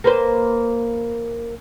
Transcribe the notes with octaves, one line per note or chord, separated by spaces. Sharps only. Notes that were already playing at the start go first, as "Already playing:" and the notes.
A#3 B4 C5